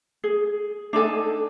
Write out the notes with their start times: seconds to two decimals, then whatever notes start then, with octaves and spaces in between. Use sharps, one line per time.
0.24 G#4
0.93 D4 D#4 A4 G#5